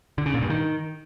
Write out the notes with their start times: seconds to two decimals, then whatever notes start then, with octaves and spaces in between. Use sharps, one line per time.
0.18 D3
0.26 C#3
0.34 A#2
0.42 G2
0.50 D#3